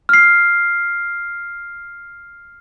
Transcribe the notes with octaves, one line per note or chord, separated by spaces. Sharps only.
F6 C7